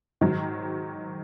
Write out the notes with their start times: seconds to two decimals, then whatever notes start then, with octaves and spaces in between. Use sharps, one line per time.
0.21 G#2 D#3 F#3